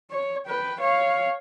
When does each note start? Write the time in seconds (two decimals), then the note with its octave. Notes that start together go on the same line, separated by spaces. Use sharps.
0.11 C#5
0.46 B4 G5
0.79 C#5 F5